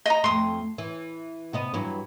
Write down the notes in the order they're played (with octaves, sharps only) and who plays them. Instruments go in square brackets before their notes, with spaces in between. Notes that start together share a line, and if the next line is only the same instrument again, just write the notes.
[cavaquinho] D#5 A#5
[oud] F2 A3 [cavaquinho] C6 D#6
[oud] E3
C3 B3 D#5
G2 E3 F#3